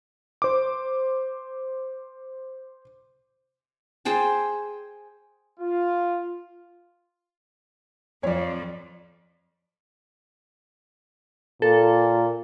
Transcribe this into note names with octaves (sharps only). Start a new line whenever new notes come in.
C5 D6
G#4 C5 G5 A5
F4
F2 C#5 D5
A#2 A4